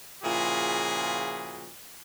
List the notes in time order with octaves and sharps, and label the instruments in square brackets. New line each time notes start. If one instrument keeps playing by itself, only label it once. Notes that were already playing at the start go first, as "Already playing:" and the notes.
[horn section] A#2 C#3 F3 E4 F#4 G#4